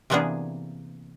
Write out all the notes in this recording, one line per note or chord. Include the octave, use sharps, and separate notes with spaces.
C3 E3 A#3 B3 D4 G#4